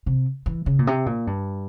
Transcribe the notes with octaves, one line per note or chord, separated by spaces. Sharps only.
C3
E3
C#3
A#2
C3
A#2
G2